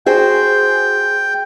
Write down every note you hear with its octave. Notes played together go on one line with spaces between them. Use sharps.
F#4 G#4 C5 G5